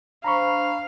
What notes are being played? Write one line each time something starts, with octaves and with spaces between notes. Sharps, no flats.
D4 C5 F5 A#5 B5 C#6